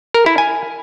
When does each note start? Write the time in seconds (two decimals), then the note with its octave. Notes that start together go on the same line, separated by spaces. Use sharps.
0.14 A#4
0.26 E4
0.38 G#5